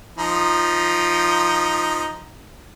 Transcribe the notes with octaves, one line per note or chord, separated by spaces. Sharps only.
F3 D#4